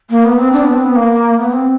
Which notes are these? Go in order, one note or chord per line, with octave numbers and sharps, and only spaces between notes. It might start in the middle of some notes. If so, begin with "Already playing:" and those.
A#3
B3
C4
D4
B3
C4
B3
A#3
B3
C4